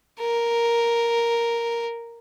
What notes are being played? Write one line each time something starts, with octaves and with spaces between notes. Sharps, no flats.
A#4